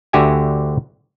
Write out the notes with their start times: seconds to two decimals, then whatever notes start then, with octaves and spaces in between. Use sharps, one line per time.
0.13 D2 D3 F#4 G4 E5 G#5